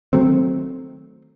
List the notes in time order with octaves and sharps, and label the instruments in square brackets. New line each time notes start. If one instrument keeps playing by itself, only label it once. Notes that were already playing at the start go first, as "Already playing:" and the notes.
[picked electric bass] D#3 F#3 A3 C4